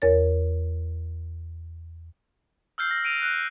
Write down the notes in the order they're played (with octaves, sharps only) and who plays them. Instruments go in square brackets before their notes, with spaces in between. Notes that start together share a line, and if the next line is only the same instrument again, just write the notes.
[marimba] E2 A#4 C#5 A6
[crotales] E6 F6 G6 C7
A#6
D7 D#7 F7
F#6